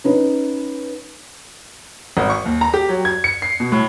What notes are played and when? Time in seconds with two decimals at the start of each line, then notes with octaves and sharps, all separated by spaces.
0.04 C#4 D#4 B4
2.17 G#1
2.30 C#6
2.45 D#2
2.61 A#5
2.74 G4
2.89 F#3
3.05 G#6
3.24 C#7
3.42 C7
3.60 B2
3.72 A2